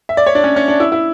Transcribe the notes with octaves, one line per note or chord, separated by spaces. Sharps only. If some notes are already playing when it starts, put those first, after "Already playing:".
E5
D5
C#5
D4
C#4
C#4
D4
E4
E4